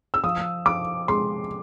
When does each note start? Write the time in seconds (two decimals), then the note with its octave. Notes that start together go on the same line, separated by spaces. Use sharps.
0.14 E6
0.24 F3 D#6
0.66 F3 D6
1.08 G#3 C6